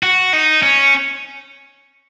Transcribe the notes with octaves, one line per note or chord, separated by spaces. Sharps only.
F#4
D#4
C#4